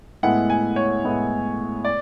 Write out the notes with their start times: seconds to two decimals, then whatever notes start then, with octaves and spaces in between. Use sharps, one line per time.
0.23 A2 G#3 B3 E4 F#5
0.50 G#5
0.76 C#5
1.04 A2 G#3 B3 E4
1.85 D5